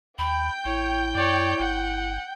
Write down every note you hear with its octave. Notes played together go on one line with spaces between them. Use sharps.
D#2 G5 B5 G6
A1 E4 C#5
F#2 C#5 D5
G1 F#5